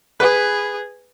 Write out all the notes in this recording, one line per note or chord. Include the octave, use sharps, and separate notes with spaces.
G#4 B4